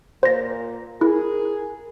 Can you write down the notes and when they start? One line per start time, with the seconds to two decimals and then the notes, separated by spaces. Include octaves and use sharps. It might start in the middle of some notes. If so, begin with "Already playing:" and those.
0.23 A#2 A#3 C5 A#6
1.01 E4 G#4 A#4